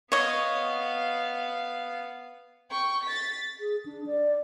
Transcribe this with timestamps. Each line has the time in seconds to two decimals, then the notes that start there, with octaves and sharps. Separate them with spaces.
0.12 B3 C#5 D#5 F5
2.70 G5 C#6
3.03 A6 B6
3.60 G#4
3.86 D4
4.06 D5